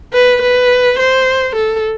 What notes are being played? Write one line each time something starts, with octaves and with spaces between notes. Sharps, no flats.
B4
B4
C5
A4